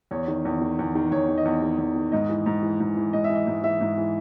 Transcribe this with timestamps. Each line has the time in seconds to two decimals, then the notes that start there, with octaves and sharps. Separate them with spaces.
0.11 E2 C#5
0.28 D#3
0.45 E2
0.61 D#3
0.79 E2
0.95 D#3
1.11 E2 C#5
1.28 D#3
1.38 D#5
1.45 E2
1.62 D#3
1.78 E2
1.96 D#3
2.12 G#2 D#5
2.29 E3
2.46 G#2
2.62 E3
2.80 G#2
2.97 E3
3.13 G#2 D#5
3.24 E5
3.29 E3
3.35 D#5
3.47 G#2
3.63 E3 E5
3.81 G#2
3.97 E3